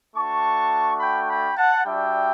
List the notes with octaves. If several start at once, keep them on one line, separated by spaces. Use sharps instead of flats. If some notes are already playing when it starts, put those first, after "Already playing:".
A3 D4 F#4 A5 C#6
G5 B5
G5 B5
F#5 A5
G3 D4 F#4 E5 G5